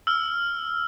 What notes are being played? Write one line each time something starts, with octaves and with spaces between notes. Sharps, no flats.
E6 F6